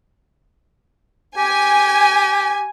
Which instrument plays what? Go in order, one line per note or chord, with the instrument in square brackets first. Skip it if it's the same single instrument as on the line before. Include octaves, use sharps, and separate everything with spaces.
[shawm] G4 [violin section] G#5